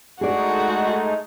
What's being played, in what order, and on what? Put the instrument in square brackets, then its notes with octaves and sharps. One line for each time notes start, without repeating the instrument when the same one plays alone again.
[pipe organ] G#3 A3 D#4 [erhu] F#4 [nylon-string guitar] G#4 D5